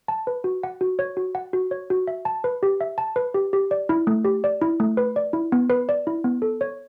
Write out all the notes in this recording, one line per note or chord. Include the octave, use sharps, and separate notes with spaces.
A5
B4
F#4
F#5
F#4
C#5
F#4
F#5
F#4
C#5
F#4
E5
A5
B4
G4
E5
A5
B4
G4
G4
D5
E4
A3
G4
D5
E4
A3
B4
D5
E4
B3
B4
D5
E4
B3
A4
C#5